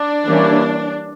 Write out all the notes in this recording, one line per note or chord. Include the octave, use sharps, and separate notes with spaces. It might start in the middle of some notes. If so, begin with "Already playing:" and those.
Already playing: D4
E3 G3 A#3 C#4